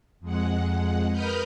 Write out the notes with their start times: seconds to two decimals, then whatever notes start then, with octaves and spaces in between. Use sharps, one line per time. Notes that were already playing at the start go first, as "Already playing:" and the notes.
0.20 F2 G#3 F#5
1.11 A#4 B4 B5 D#6 F6 G6